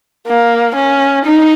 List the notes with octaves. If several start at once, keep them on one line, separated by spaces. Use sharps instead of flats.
A#3
C#4
D#4